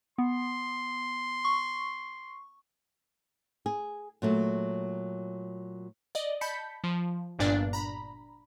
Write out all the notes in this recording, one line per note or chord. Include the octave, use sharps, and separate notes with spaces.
B3 C6
C#6
G#4
A#2 F#3 A3
D5 D#5
A5 B5 G6 B6 C#7
F3
G1 G2 A#2 D4 D5
A#5 B5